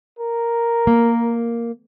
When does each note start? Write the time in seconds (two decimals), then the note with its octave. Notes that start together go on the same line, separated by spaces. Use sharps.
0.19 A#4
0.87 A#3